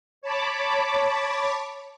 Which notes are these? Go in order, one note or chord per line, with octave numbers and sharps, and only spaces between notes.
C#5 A5 B5 D6